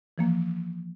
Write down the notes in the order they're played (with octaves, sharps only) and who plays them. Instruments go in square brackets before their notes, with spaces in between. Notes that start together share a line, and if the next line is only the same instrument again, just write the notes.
[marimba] E3 F3 A#3